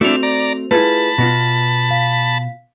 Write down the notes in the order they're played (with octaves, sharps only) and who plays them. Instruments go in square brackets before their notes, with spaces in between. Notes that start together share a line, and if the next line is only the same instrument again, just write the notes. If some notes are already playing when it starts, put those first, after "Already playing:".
[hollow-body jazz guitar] A3 C4 [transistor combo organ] D4 E4 [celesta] F#4 F7
[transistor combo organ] D5 A#5
[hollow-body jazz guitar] A3 F4 G#4 [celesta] E4 B4 [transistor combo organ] A5 B5
[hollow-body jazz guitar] B2 B3 F4 [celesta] A#6
[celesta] F5 B6